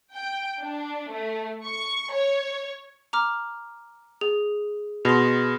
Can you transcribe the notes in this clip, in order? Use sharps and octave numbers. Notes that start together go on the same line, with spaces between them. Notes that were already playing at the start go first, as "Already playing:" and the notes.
G5
D4
A3
C#6
C#5
A#5 D6 F6
G#4
B2 G#4 C6